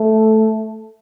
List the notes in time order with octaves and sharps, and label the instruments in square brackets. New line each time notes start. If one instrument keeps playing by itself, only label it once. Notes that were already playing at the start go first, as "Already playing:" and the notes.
Already playing: [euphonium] A3